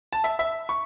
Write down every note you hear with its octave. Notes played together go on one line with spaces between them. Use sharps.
A5
E5
E5
C#6